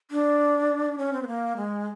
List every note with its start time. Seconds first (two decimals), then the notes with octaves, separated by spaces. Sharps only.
0.11 D4
0.98 C#4
1.13 C4
1.22 B3
1.28 A#3
1.56 G#3